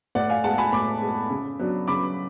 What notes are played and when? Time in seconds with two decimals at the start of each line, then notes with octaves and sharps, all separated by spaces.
0.15 A2 D5 F#5
0.29 F5 G#5
0.44 G#3 B3 F#5 A5
0.58 G#5 B5
0.72 A2 B5 D6
1.02 G#3 B3
1.30 C#3
1.59 F#3 B3 D4
1.88 C#3 B5 D6